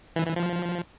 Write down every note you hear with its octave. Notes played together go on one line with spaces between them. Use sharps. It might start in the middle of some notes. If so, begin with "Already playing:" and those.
E3
E3
F3